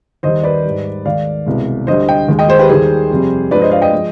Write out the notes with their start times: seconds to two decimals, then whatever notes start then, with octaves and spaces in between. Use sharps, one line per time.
0.23 D#2 D#3 G3 C5 D#5
0.43 B4 D5
0.65 G#2 G3
1.05 D#2 D#3 G#3 D5 F5
1.46 C2 B2 G#3
1.87 D2 D3 G3 C5 D#5
2.09 D#5 G5
2.28 D#2 D#3 G#3
2.39 D#5 G5
2.49 G#4 C5
2.59 G4 B4
2.69 D#2 D#3 G3 G#4 C5
3.10 F2 C3 G3
3.51 G2 F3 G#3 B4 D5
3.61 C5 D#5
3.71 D5 F5
3.82 D#5 G5
3.93 F3 G#3